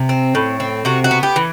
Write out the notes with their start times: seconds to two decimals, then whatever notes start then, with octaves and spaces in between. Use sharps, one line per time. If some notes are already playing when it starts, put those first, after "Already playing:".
Already playing: C3
0.09 C4
0.35 A2
0.60 C4
0.85 C3 F#4
1.04 F#4
1.11 B3
1.23 G4
1.36 E3